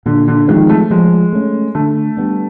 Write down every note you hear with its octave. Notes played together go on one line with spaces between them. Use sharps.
A#2 D3
D3
D#3 F3 G#3 C4
A3
F3 G#3
A3 C#4
D3 A3
G3 B3 D4